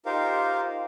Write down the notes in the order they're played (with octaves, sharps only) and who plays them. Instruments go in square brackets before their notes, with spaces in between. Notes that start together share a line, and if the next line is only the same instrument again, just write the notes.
[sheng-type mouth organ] D#4 F4 G4 A#4 C5 F5